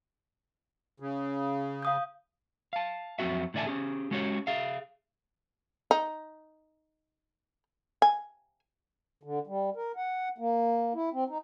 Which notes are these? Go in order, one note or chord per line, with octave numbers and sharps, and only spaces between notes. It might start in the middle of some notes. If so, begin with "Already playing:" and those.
C#3
F5 D#6 G6
F5 A5
F2 F#3 C4 F#4 E5
A2 D3 D5 E5 G#5 A5
C#4 G4 G#4
G#3 C#4 F#4 G4 C5 C#5
G#4 E5 F5
D#4
G#5
D3
G3
A#4
F#5
A#3
E4
C4
D#4